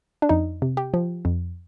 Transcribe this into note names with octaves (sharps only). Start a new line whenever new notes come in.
D4
F2 D#4
C3
G4
F3
F2